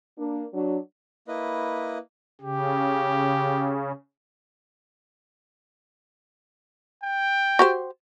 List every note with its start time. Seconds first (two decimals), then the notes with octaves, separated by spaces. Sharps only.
0.19 A#3 D4
0.54 F#3 D4
1.28 A#3 E4 B4 D#5
2.41 C#3 G4
7.03 G5
7.59 F#4 G4 C5